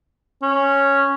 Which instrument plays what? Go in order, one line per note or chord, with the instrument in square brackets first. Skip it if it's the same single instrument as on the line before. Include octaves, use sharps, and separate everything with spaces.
[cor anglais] C#4